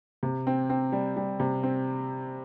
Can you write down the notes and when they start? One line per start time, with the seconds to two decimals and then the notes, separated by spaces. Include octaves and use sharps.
0.23 C3
0.47 C4
0.70 C4
0.92 G3
1.17 G3
1.40 C3
1.63 C4